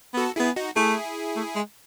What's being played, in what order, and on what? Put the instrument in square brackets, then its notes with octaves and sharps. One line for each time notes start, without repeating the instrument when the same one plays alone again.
[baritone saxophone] B3 [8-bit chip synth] F#4 A4
[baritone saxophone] B3 [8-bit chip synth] E4 G#4
[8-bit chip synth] D#4 F#4
[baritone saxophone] A3 [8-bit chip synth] E4 G#4
[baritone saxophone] A3
G#3